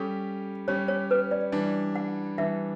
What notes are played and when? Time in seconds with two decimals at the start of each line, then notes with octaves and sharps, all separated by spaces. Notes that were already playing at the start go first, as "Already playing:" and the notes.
Already playing: G3 C#4 G4 A4
0.68 G3 C#4 G4 C#5
0.88 C#5
1.11 B4
1.31 D5
1.52 E3 G3 D4
1.95 F#5
2.38 E3 G3 D4 E5